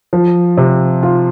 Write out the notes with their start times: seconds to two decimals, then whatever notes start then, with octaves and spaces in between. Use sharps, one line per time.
0.13 F3
0.57 C3
1.03 F4